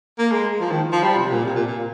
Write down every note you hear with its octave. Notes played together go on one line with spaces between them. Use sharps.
A#3
G#3
F3
D#3
F3
G3
C3
A#2
C3
A#2
A#2